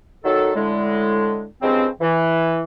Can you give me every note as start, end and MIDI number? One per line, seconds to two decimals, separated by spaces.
0.24 0.51 51
0.24 0.51 54
0.24 0.51 69
0.55 1.44 45
0.55 1.44 50
0.55 1.44 56
1.62 1.87 43
1.62 1.87 49
1.62 1.87 53
1.62 1.87 56
1.62 1.87 60
2.01 2.62 52